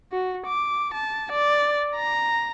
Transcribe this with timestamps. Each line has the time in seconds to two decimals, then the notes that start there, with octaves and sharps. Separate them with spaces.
0.12 F#4
0.46 D6
0.94 A5
1.32 D5
1.96 A#5